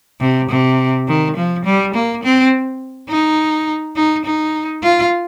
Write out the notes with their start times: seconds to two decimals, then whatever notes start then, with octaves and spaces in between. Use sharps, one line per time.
0.21 C3
0.49 C3
1.08 D#3
1.36 F3
1.65 G3
1.94 A#3
2.23 C4
3.09 D#4
3.96 D#4
4.25 D#4
4.83 F4